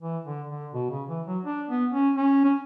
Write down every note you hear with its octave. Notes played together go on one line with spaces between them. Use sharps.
E3
D3
D3
B2
C#3
E3
F#3
D4
B3
C#4
C#4
C#4